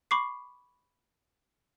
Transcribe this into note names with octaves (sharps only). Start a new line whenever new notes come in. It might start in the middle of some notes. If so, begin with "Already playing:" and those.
B5 C#6 D6 C7